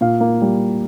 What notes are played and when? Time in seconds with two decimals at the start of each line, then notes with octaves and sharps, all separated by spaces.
0.01 A#2 F5
0.20 A#3
0.42 G3